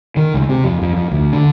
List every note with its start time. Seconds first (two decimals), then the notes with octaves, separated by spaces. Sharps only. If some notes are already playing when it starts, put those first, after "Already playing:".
0.16 D#3
0.34 C#2
0.49 C3
0.64 F2
0.82 F2
0.96 F2
1.11 D2
1.33 D3